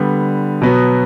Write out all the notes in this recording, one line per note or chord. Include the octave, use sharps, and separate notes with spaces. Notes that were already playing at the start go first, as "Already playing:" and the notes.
Already playing: D3 G3 B3
B2 F#3 B3